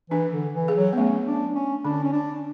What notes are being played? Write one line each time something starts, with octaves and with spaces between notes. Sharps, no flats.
E3 D4
D3
E3
G#4
F#3
B3
A3 C#4
D4
C#4
D3 D4
C#4
D4